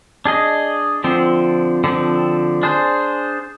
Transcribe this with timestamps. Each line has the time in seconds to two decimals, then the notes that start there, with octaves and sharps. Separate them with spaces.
0.25 D4 G#4 D#5
1.04 D3 F3 C4
1.84 D3 F3 C4
2.63 D4 G#4 C5